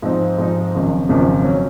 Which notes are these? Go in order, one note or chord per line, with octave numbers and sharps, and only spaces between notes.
G#2 F3 C4 D#4
G#2 F3 C4 D#4
G#1 F#2 C#3 F3
G#1 F#2 C#3 F3
F#3 C#4